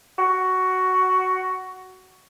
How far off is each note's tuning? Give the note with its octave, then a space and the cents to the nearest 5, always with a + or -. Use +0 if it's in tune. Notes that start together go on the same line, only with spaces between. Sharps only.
F#4 +10